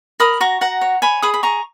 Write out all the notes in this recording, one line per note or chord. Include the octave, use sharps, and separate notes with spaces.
A#4 B5 D#6
F#4 A#5 C#6
F#4 F#5 A#5
C#5
C#5 G#5 B5
G#4 B5 D#6
B5
G#4 A#5 C#6